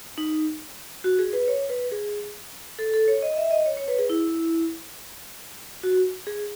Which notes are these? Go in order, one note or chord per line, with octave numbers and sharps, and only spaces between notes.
D#4
F#4
G#4
B4
C#5
B4
G#4
A4
A4
C#5
D#5
E5
D#5
C#5
C#5
B4
G#4
E4
F#4
G#4